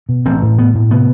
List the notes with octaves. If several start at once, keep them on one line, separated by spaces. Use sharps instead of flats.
B2
A1 C4
A2
A2 B3
A2
C3 B3